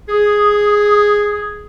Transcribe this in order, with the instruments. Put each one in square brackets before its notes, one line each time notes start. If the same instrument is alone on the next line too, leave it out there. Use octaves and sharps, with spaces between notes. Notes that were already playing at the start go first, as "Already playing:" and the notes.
[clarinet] G#4 [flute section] D#6